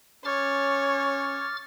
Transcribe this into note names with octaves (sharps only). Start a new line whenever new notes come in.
C#4 C#5 D6 F6 A6